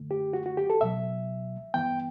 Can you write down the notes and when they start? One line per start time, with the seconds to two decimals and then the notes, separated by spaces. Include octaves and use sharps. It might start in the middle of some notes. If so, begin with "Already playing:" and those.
Already playing: F#2 D3 A3
0.11 G4
0.33 F#4
0.46 F#4
0.57 G4
0.70 A4
0.80 C#2 B2 F#3 E5
1.74 G2 E3 B3 G5